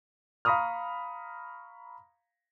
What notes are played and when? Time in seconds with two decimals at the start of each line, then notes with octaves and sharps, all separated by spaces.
0.45 F5 A#5 B5 C#6 D#6 F6